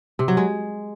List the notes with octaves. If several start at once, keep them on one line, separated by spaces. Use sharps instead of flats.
C3
F#3
G#3